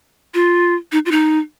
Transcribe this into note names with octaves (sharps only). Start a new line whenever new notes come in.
F4
D#4
F4
D#4